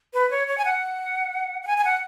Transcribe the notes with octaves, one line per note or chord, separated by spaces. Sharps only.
B4
C#5
C#5
G#5
F#5
F#5
G#5
G#5
F#5